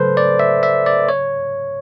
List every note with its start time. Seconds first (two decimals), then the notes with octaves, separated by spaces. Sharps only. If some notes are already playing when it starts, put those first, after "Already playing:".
Already playing: C#3 F#3 A3 A4 B4 C5
0.17 D5
0.40 E5
0.63 E5
0.86 D5
1.09 C#5